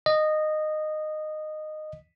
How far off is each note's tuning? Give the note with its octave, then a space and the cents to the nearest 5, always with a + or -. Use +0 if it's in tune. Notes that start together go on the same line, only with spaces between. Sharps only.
D#5 -15